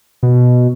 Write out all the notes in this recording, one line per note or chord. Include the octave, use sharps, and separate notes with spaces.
B2